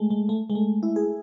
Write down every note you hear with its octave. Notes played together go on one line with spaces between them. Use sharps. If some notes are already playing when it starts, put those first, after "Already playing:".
Already playing: G#3 A3
G#3
A3
G#3
A3
E4
G#4